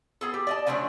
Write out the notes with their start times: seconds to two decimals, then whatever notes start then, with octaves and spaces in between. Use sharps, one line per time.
0.21 B3 G#4 A4
0.34 G4
0.47 D5 D#5 A5
0.67 C#3 F3 F#3 A3 D4 F#4